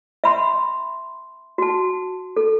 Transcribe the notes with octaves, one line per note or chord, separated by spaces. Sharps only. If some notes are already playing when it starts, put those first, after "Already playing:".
E5 B5 C6
F#4 A5
A4